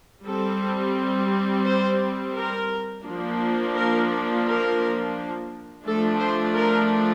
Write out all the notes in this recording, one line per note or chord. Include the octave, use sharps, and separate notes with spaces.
G3 C4 A4
C5
A#4
F3 A#3 D4
A#4
A#4
F3 A3 D4 A4
C5
A#4